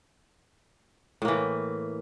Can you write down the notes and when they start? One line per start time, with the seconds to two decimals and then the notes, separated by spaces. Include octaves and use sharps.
1.22 A2
1.25 A#3
1.28 E3